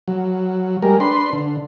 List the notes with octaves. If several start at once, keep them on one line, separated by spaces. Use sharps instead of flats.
F#3
G3 G#3 A#4
D4 B4 C6
D3